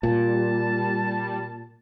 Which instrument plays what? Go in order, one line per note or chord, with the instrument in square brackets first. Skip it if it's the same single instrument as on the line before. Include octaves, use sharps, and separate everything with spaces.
[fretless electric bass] A#2 [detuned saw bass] G3 [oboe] A5